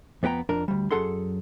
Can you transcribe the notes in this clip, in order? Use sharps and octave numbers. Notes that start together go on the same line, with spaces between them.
F2 B3 B4 G5 A#5
F2 D4 A#4
D2 G3
F#2 G#3 G#4 A4 F#5 C6